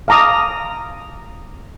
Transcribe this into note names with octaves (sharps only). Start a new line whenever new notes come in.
F5 A5 A#5 D6 D#6